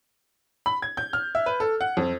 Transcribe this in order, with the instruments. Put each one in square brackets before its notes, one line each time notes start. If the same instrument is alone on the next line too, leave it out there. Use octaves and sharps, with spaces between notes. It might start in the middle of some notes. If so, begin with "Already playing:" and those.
[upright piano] B5
G#6
G6
F6
E5
B4
A4
F#5
F2